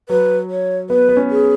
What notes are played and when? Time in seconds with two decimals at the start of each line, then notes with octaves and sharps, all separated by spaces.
0.09 F#3 B4
0.50 C#5
0.90 B3 B4
1.09 B3
1.17 C#4
1.30 G#4